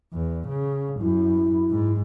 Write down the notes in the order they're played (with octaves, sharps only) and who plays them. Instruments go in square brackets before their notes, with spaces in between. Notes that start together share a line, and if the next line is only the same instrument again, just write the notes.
[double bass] E2
C#3
[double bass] F#2 [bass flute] E4
[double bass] G#2